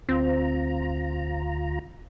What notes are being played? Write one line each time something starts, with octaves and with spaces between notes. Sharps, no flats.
D2 C4 F4 A#5